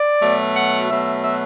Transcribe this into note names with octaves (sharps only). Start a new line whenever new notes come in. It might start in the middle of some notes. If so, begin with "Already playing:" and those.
Already playing: D5
B2 F#3 A3
F#5
B2 F#3 A3 E5
E5